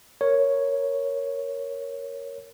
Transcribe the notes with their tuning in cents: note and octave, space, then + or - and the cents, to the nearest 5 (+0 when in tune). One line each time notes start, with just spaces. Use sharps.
A#4 +0 C#5 +0